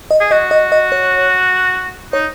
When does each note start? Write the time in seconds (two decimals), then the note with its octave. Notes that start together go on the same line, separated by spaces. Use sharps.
0.11 D#5
0.20 G#4
0.31 F#4 D#5
0.51 D#5
0.72 D#5
0.92 C#5
2.13 D#4 C#5